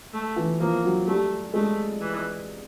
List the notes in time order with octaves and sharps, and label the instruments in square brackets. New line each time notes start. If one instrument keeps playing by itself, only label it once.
[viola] A3
[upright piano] E3
[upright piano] F3 [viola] A#3
[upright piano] F#3
[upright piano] G3 [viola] A3
[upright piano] G#3 [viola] A3
[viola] E3